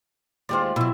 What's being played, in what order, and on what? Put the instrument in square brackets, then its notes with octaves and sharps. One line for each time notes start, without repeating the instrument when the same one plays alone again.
[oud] D#2 G#3 C5 [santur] F4 G4 D5
[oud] B2 F#3 [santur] E4 E5